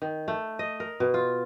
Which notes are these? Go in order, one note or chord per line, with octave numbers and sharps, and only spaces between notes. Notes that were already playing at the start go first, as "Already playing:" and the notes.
D#3
A3
D#5
A#4
B2
F4